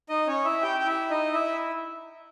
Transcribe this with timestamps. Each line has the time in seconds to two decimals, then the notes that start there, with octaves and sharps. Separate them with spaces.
0.09 D#4 D#5
0.27 C#4 C#5
0.45 E4 E5
0.62 G4 G5
0.79 G5
0.87 E4 E5
1.10 D#4 D#5
1.33 E4 E5